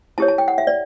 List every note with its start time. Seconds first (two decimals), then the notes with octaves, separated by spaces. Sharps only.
0.18 E4 G4 C#5 A5
0.28 A5
0.38 G5
0.48 F#5
0.58 E5
0.67 D5